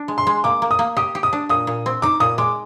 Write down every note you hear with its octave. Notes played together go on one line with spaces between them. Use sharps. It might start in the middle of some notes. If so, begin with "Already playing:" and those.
Already playing: D4
G#3
C6
G#3
A#3 D6
A#3
D#6
A#3
G4 D#6
G4
D#6
D4
A#2 D#6
A#2
C4
D#4 D6
A#2 D#6
G#3 D6